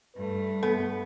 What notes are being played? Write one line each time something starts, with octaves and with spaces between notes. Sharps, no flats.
G2 A3 B4
B3 A4